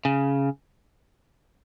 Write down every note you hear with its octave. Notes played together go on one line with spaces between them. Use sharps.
C#3